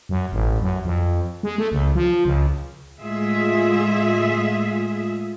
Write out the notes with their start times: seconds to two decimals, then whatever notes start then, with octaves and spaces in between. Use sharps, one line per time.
0.09 F#2
0.32 A1
0.61 F#2
0.85 F2
1.43 G#3
1.58 A3
1.72 C#2
1.95 F3
2.25 C#2
3.01 A2 G#3 F4 G#4 E5